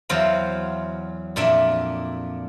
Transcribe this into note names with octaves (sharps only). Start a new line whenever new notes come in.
E2 F#3 C5 F5
F2 A#2 D4 E5